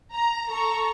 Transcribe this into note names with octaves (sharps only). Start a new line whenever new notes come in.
A#5
A4 A#5 C#6